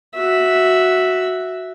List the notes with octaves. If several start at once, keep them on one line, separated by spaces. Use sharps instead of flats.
F#4 E5